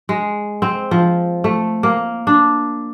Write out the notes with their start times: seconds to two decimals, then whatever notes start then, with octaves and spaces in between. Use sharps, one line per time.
0.09 G#3
0.62 C4
0.91 F3
1.44 A3
1.83 A#3
2.27 D4